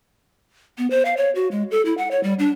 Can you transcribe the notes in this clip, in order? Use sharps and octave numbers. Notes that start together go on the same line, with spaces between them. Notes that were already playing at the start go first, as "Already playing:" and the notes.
B3
C5
F5
C#5
F#4
G#3
A4
E4
F#5
C#5
G3
D4